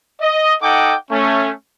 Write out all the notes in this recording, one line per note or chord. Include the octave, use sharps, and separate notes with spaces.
D#5
D#4 A4 D#5 F#5 G5 D6
A3 C#4